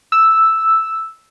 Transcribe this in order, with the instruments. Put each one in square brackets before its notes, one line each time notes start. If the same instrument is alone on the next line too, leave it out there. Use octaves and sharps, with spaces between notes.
[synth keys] E6